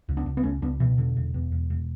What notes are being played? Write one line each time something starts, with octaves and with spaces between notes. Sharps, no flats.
C#2
B3 D4
C#2
B3
C#2 A3 C#4
C#2 B3 D4
B2 E3
E1 D3
E1
E2
E1
E1